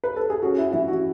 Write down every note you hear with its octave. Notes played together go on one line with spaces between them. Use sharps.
B4
A4
G#4
C#4 F#4
E4
E3 E4
F#4